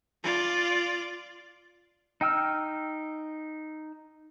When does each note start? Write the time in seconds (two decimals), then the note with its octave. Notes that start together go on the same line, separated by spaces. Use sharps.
0.23 F4 D5
2.21 D#4 G5 E6 F6